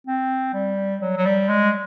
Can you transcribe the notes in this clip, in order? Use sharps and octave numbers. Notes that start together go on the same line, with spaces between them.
C4
G3
F#3
F#3
G3
G#3